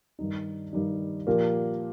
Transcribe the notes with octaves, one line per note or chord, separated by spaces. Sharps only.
G2 D#3 G3 D#4
G2 D#3 G3 D#4
A#2 F3 A#3 G4 A#4